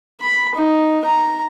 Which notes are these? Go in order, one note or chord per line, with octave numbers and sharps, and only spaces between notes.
B5
D#4
A#5